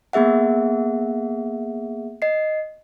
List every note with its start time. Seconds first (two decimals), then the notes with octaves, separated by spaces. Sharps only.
0.13 A#3 B3 G#4 E5 F#5
2.22 D#5 C7